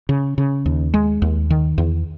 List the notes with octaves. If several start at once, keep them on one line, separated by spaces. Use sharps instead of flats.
C#3
C#3
D#2
G#3
D#2
D#3
E2